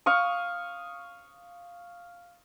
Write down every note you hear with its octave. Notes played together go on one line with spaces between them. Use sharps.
F5 C#6 D#6